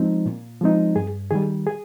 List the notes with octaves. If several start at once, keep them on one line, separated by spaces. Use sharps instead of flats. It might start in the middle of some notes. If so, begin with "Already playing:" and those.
Already playing: F3 G#3 C4 D#4
A#2
F3 G#3 C4 D#4
G2 G#4
D#3 G3 G#4
G#4